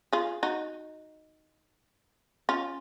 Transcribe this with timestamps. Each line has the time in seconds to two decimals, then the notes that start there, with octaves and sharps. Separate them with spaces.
0.13 F4 G#4
0.43 D#4 F#4
2.49 C#4 F4